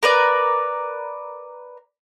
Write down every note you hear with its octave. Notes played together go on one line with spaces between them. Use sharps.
A#4 B4 D5